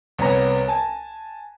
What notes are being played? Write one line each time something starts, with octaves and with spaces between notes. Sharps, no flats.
C2 B3 C#5 A#5 A#6
G#5 A5